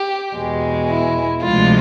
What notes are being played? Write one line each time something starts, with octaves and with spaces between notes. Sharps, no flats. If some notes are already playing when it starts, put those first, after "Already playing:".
Already playing: G4
E2 B2 G#3
E4
D2 C3 F3 G#3 F4